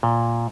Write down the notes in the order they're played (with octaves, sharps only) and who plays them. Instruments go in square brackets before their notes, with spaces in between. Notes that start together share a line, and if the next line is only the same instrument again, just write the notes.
[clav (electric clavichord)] A#2